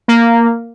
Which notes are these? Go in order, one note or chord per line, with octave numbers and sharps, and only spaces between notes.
A#3